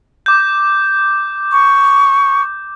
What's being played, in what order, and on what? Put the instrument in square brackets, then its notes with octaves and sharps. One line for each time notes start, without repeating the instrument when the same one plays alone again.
[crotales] D6 G6
[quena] C#6